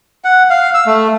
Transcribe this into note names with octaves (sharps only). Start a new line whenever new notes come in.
F#5
F5
E6
A3